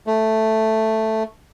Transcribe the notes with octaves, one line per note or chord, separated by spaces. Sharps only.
A3